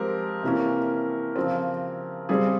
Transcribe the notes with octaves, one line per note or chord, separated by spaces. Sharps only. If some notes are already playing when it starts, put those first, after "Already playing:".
Already playing: F3 G#3 C4 G4 A#4
C3 E3 A#3 C#4
C#3 F3 C4
C#3 G3 C4 G#4